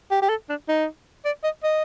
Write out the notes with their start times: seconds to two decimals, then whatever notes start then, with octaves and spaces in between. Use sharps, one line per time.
0.11 G4
0.22 G4
0.29 A4
0.49 D4
0.69 D#4
1.25 D5
1.44 D#5
1.63 D#5